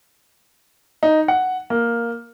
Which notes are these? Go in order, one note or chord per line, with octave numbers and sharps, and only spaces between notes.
D#4
F#5
A#3